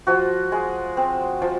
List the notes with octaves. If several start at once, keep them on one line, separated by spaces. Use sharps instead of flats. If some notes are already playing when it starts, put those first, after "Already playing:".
F3 F#4
G#3
C4
F3